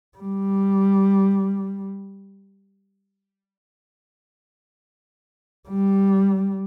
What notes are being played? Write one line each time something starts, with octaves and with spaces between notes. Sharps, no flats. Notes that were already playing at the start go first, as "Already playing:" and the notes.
G3
G3